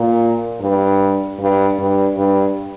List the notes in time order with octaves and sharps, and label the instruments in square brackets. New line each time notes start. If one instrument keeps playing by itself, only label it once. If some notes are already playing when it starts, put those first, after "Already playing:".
Already playing: [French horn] A#2
G2
G2
G2
G2